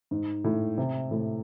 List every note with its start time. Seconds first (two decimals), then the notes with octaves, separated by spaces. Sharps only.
0.11 G#2
0.44 A2
0.78 C3
1.11 A2